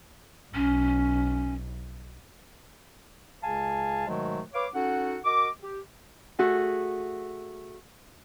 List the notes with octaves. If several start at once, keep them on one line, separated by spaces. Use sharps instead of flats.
B1 C#4
C#2 C#3 F5 G#5 A5
G#2 B2 D#3 F#3 G#3 A3
B4 C#5 F5 D6
C#4 D#4 F#4 A4 F#5
F#4 A#4 D#5 D6
G4
A3 F#4 G#4